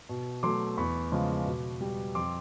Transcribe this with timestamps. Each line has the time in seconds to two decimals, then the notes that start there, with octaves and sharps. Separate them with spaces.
0.09 B2
0.43 F#3 A3 C6 D6
0.77 E2 B5 C#6
1.12 C#3 F3 G#3
1.46 B2
1.81 G3
2.15 F2 C6 D6